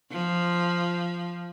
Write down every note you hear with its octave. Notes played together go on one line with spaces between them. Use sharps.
F3